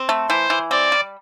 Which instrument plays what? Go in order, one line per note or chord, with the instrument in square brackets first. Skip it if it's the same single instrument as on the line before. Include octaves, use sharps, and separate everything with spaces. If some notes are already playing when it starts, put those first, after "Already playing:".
Already playing: [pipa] C4
A3
[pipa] E3 [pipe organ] C5
[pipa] E3
[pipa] C4 [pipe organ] D5
[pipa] G3